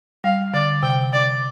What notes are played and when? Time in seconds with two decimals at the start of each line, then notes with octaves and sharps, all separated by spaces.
0.24 G3 F5
0.54 D3 D5
0.83 C3 G5
1.13 D5